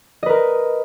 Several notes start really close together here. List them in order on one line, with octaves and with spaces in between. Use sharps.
D#5 B4 A#4